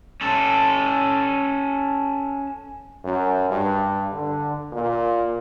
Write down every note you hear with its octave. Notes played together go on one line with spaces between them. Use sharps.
C#4 A4
F#2
G2
D3
A#2